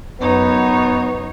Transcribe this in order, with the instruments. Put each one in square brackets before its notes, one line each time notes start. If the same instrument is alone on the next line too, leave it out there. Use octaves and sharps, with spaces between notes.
[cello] F#2 [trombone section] B3 [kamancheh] D#4 C#5